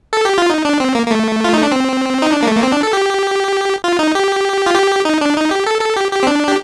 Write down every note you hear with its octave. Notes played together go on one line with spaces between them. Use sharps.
A4
G4
F4
D#4
D4
C4
A#3
A#3
A3
F4
D#4
D4
C4
D#4
D4
A#3
A3
A#3
C4
D4
A4
G4
F4
D#4
G4
F4
G4
D#4
D4
D#4
G4
A4
A4
G4
G4
C4
D4
G4